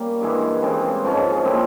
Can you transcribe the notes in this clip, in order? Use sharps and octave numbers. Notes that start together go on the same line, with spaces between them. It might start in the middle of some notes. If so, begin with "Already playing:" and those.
Already playing: G3 A#3 C#4
G2 E3 G#3 E4
C#3 E3 G#3 C4
G#2 F3 G#3 C#4
A#2 G#3 C4 E4